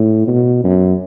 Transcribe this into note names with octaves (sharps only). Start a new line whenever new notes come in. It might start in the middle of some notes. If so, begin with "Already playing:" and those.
Already playing: A2
B2
F#2